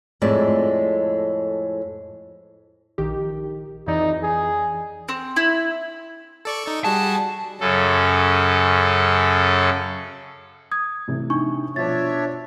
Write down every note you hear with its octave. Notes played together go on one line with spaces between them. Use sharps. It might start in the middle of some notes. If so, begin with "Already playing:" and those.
F2 A2 G#3 D5
A#1 D#3 G4
F2 E3 D#4 D5
G#4
C4
E4
A4 D5 C#6
D#4 A4 C#6
G3 F#4 G#4 A5
F#2 C#3 A4
D#6 G#6
A2 C3 E3
D4 D#4 C#6
B2 F3 D4 C5 C#5 E5 A6